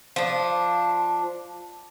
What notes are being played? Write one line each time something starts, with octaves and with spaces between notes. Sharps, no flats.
F3 D4